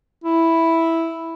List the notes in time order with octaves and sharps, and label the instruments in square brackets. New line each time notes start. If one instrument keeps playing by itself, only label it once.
[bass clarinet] E4